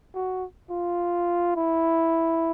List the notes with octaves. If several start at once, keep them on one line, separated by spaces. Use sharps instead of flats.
F#4
F4
E4